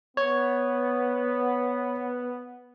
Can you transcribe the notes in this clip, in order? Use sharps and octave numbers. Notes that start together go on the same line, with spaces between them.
B3 C#5